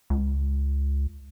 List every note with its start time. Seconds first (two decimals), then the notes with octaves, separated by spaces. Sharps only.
0.10 C#2